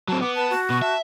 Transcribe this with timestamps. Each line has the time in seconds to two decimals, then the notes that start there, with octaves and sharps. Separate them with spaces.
0.08 F#3 C4 A5
0.21 B3 D6
0.35 B4 A5
0.50 F#4
0.70 B2 C#6
0.82 E5 A5